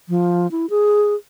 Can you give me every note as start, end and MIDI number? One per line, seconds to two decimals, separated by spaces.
0.09 0.49 53
0.51 0.66 64
0.70 1.14 68